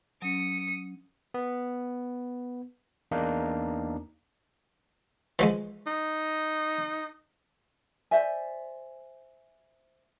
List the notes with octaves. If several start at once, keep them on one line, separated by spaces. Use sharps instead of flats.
F#3 C#4 D#6 C#7
B3
E2 A#3 D4 D#4 F5
E3 F3 G#3
D#4
C5 D5 E5 G#5